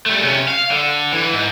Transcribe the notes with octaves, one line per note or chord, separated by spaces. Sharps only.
G3 A3
C3 C#4
F5
D3
E3
G#2